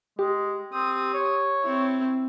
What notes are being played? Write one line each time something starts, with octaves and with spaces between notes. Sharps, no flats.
G#3 G4
C4 D#6
C#5
C4 E4